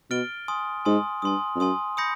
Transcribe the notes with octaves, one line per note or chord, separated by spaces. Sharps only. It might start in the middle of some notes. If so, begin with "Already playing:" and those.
B2 F6 A6 D7 G7
G#5 C6 D#6
G#2 G#5 C6 D#6
G2 G#5 C6 D#6
F2
F#2 G#5 C6 D#6
B5 D#6 G6 A#6 C#7